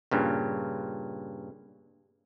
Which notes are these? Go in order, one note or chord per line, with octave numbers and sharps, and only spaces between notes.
G2 A#2 C#3